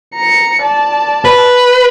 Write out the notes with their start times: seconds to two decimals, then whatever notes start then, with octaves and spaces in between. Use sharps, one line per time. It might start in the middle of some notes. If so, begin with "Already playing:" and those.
0.15 A#5 C#7
0.62 D5 A5
1.25 B4